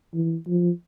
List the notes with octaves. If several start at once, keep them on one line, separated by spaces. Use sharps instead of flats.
E3
F3